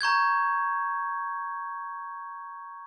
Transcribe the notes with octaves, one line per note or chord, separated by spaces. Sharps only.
A#5 C#6 G6 G#6